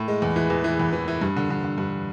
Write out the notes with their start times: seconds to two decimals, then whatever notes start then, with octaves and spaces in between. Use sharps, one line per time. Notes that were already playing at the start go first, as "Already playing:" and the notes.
Already playing: A2
0.08 G#3
0.22 E2
0.36 E3
0.50 E2
0.64 E3
0.80 E2
0.93 E3
1.08 E3
1.21 G2
1.36 D3
1.50 D3
1.64 D3
1.78 G2